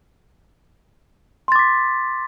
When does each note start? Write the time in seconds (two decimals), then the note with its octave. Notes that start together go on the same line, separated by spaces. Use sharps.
1.48 C6
1.52 A6
1.56 D6
1.59 B6